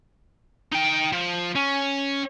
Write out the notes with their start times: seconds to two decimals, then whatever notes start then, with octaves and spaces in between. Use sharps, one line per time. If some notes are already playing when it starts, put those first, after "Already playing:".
0.72 D#4 G5
1.12 F3
1.56 C#4